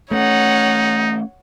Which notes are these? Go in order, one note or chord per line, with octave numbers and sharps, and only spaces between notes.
A3 C4 C#4 D#4 C#5 F#5